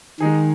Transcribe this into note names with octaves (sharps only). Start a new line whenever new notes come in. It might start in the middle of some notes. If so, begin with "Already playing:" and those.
D#3 G#3 D#4 G#4